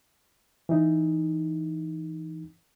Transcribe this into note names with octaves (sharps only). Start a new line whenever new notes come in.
E3 D#4